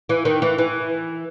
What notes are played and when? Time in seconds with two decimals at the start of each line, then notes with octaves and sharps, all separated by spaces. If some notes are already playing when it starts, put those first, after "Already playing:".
0.09 E3
0.25 D#3
0.42 E3
0.58 E3